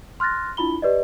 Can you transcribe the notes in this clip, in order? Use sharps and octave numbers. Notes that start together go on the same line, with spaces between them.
C6 F6 F#6 A6 A#6
D4 E4 F4 B5 G7
G4 B4 D5 D#5